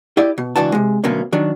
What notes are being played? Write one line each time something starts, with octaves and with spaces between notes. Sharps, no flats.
E4 G4 D5 D#5
B2
C#2 E3 D4 F#4 A5
C3 G#3
D2 B2 F#3 A#3 C#4
D#3 F#3 D4